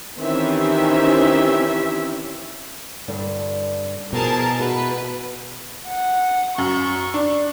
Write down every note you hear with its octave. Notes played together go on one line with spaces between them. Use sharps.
D#3 E3 C4 C#4 G4 E5
G2 D3 D5
B2 F3 G#4 A#4 A5
F#4 G#4 B4 E5
F#5
F#2 C#6
D4